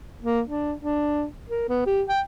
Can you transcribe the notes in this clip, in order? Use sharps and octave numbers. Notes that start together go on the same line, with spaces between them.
A#3
D4
D4
A#4
B3
G4
G5